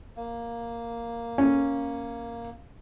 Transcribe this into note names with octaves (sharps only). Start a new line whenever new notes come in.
A#3
C#4